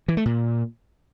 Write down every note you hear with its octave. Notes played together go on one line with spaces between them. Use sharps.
E3
A3
A#2